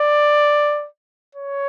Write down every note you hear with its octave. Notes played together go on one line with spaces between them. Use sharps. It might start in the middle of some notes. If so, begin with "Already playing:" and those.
Already playing: D5
C#5